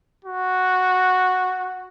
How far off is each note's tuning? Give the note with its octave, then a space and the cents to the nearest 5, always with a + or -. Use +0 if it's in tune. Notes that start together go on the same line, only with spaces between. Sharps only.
F#4 -5